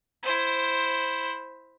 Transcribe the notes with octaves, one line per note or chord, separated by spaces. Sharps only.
E4 C5